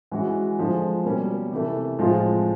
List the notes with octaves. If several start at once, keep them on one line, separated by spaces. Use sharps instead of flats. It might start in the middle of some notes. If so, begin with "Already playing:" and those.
E3 G#3 C#4 F#4
D3 F3 G#3
B2 G3 A#3 C#4
C3 E3 A3
A2 F3 G#3 C4 F4